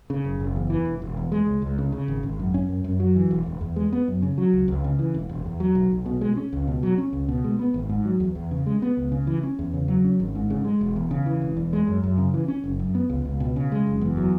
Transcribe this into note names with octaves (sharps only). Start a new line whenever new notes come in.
C#3
F#1
F#1
E2
E3
E1
E1
E2
G#3
C#2
C#2
C#3
C#3
G#1
G#1
F#2
C#4
F#2
F#2
F#3
E3
E1
E1
E2
G#3
B3
F#2
C#3
F#3
C#2
C#2
C#3
E3
E1
E1
E2
F#3
B1
B1
B2
G#3
C#4
C#2
B2
F#3
C#4
C#2
B2
G#3
B3
G#1
G#2
F#3
E2
E2
C#3
G#3
B3
C#2
C#3
E3
C#4
E2
C#3
F#3
C#4
G#1
G#2
C#3
G#3
E1
E2
C#3
E3
E1
E2
G#3
F#2
F#2
C#3
E3
C#4
F#1
F#2
B3
C#2
C#2
B2
C#3
G#3
F#1
E2
F#3